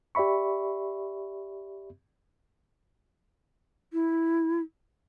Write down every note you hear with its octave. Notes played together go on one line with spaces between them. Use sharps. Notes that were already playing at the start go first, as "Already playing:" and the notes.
G4 D5 E5 B5 C#6
E4